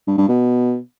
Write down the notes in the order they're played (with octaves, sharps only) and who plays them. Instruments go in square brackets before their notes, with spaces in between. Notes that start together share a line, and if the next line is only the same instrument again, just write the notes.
[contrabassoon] G2
G2
B2